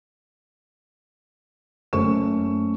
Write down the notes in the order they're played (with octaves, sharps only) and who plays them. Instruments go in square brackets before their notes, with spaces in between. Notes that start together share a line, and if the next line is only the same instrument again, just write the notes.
[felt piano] F#1 A3 C#4 C5 C#6 E7